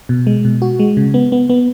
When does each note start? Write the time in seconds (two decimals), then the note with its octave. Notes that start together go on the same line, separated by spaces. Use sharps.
0.09 B2
0.27 G#3
0.45 B2
0.62 F#4
0.79 G#3
0.97 C#3
1.14 B3
1.32 B3
1.50 B3